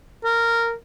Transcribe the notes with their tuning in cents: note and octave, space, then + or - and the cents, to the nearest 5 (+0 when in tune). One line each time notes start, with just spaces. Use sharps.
A#4 -10